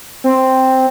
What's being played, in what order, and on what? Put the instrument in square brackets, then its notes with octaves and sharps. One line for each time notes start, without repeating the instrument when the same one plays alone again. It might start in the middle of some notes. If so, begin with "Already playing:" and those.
[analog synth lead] C4